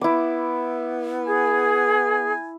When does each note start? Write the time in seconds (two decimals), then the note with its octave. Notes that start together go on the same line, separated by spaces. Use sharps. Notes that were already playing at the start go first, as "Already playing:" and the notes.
0.01 B3 E4 D6
1.28 G#4 G#5